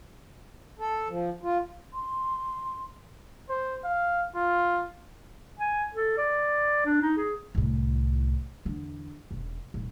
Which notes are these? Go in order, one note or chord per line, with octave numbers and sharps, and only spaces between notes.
A4
F3
F4
C6
C5
F5
F4
G#5
A4
D5
D4
D#4
G#4
C2 A2
E2 D3
E1
D#1